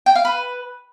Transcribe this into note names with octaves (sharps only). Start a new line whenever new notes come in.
G5
F5
B4